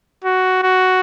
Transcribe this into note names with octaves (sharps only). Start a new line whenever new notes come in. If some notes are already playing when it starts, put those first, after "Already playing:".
F#4
F#4